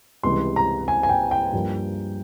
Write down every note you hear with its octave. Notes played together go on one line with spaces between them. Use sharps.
C#2 C3 E3 G3 C6
A#5
G#5
G#5
G5
G5
G2 F3 A#3